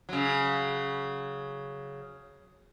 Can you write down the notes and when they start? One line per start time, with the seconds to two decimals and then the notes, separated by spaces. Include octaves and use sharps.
0.09 C#3 F#3